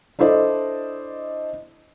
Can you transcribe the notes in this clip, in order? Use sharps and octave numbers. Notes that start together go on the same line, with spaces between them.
D4 E4 A4 C5 D5 D#5